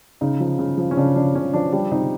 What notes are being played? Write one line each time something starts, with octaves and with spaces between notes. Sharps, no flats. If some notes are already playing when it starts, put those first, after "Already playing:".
C#3 D#4
F3
C#3
F3
C#4
C#3 D4
F3 D4
C#3 C#4
F3 D4
G3 D4
C3 D#4